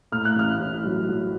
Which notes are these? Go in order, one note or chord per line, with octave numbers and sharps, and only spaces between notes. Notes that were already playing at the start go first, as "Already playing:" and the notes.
A2 F6
F#6
A1 F6
A1
F#3
F#3